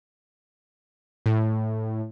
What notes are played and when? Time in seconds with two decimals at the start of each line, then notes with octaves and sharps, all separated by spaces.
1.26 A2